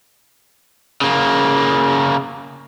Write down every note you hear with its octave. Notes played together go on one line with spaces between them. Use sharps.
C#3 A#3